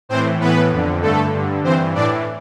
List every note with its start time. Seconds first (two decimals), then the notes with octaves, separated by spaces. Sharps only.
0.09 A2 E3 C4 C5
0.40 A2 E3 B3 B4
0.71 F2 D3
1.02 G2 D3 A3 A4
1.33 G2 D3
1.64 G2 E3 C4 C5
1.95 A2 E3 D4 D5